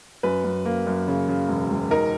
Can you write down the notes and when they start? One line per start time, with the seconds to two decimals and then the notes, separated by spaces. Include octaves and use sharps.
0.23 F#2 B4
0.44 F#2
0.65 A#3
0.87 F#2
1.08 C#3
1.28 C#3
1.48 E1
1.70 E1
1.91 D#4 A#4